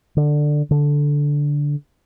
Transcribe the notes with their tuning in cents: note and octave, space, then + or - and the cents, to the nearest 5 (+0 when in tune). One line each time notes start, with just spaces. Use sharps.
D3 +10
D3 -10